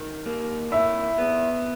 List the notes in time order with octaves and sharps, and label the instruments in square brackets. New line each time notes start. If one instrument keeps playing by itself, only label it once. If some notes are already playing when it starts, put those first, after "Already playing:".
Already playing: [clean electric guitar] D#3
A#3
[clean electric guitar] E4 [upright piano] E5
[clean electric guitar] B3